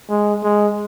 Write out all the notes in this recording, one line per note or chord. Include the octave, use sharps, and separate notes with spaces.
G#3
G#3